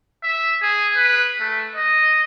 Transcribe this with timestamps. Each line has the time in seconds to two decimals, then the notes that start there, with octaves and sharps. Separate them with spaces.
0.23 E5
0.62 G#4
0.96 B4
1.40 A3
1.76 D#5